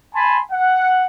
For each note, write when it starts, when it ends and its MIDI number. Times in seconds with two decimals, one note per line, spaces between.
0.15 0.39 80
0.15 0.39 81
0.15 0.39 83
0.15 0.39 84
0.52 1.06 78